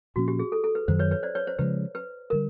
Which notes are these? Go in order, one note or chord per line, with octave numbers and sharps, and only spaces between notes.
A#2 F3 A#3 C#4 F#4
G4
G#4
A4
A4
B4
F#2 D#3 F#3 C5
B4 C#5
B4 C#5
C5 D5
B4 C#5
C5
C#3 F3 G#3 B4
B4
D3 G3 A#4